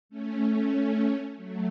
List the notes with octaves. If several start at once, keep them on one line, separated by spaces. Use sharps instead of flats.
A3 C#4
A3 C#4
A3 C#4
F#3 A3